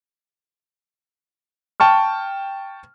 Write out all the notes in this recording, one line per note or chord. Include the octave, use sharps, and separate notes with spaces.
G5 A5 C#6 F6